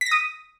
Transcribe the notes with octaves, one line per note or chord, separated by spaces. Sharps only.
B6
A#6
D#6